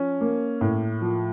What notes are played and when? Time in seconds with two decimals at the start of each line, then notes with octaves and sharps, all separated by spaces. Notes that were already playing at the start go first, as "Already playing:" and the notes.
Already playing: F3 C#4
0.21 A#3
0.61 A2
1.01 F3